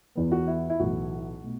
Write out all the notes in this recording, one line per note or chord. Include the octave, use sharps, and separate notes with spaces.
E2 E3 B3
F#4
E4
E4
B1 A2 E3 F#4
B2 A3